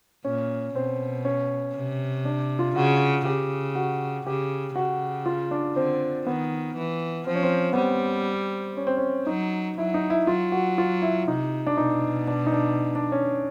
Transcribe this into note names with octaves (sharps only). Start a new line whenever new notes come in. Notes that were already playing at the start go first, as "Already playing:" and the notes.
A#2 C#4
B2 C4
C#4
C3
D4
F4
C#3 F#4
C#3 G4
F#4
C#3 G4
C#3 F#4
F4
D4
D3 C4
D#3 B3
E3
F3 C4
C#4
C4
B3
G3 C4
C#4
C4
C#4
F#3 D#4
F#3 E4
D#4
E4
F#3 F4
F#4
F4
E4
C3 D#4
D4
B2 D#4
D4
D#4
D4
D4
C#4